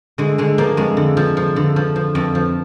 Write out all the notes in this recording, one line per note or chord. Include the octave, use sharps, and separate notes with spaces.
D3 G#3
D3 G#3
F3 A#3
F2 G#3
D3
F3
F3
D3
F3
F3
F2
F3